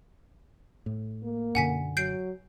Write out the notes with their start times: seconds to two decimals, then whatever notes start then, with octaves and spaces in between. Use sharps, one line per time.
0.86 A2
1.23 A#3
1.55 F#2 B2 D3 F#5 G#5 B6
1.97 F#3 G6 C7 D7